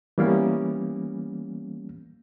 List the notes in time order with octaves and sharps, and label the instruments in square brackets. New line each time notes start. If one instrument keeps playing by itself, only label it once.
[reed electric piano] E3 G3 A#3 B3 C#4